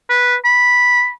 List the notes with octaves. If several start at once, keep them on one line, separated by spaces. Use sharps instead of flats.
B4
B5